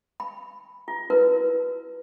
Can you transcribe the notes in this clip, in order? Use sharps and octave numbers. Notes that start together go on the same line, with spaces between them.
B5
F4
E4 F#4 A#4 B4